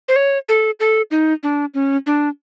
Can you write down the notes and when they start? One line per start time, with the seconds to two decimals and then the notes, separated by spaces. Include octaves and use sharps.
0.08 C5
0.16 C#5
0.49 A4
0.80 A4
1.11 D#4
1.43 D4
1.74 C#4
2.06 D4